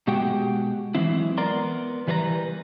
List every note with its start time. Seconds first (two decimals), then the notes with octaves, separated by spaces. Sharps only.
0.07 B2 G#3 F#4 G4 F#5 G5
0.95 E3 F#3 G#3 C4 E4
1.38 B3 A#4 D5 A#5 C6
2.07 E3 G3 B4 C5 A#5